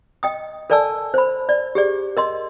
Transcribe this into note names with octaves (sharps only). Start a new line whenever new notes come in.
D#5 G5 D#6
A4 A#4 D5 G#5 A5 E6
C5 B5
D5
G4 G#4 D5
A#4 D#5 C6